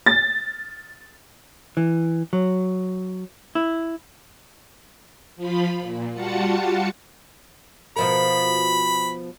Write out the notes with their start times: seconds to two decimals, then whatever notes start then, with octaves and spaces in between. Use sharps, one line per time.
0.06 A6
1.77 E3
2.33 F#3
3.55 E4
5.36 F3 F4 B5
5.81 A#2
6.14 G3 F4 F#4 F#5 A5 C#7
7.96 B2 F3 A#4 B5